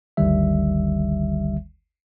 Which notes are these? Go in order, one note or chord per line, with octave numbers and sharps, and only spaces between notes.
G1 D2 D3 D#3 G3 E5